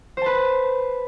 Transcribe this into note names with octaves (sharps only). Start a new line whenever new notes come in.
B4 C5 A5